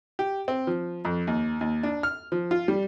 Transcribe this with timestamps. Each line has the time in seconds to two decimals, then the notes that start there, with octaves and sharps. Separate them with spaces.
0.19 G4
0.48 C4
0.67 F3
1.05 F2
1.27 D#2
1.61 D#2
1.83 D4
2.03 F6
2.32 F3
2.51 F4
2.68 G3